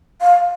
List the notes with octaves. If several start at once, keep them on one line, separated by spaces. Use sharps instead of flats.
F5